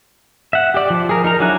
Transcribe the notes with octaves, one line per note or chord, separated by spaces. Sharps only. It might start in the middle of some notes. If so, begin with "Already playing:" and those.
E5 F#5
G4 D5
F3
G#4 A#4
D#4 A#4 A#5
F#3 D4 E4 G#5 F#6